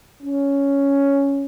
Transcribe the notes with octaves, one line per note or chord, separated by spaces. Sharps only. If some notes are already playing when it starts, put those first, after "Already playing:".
C#4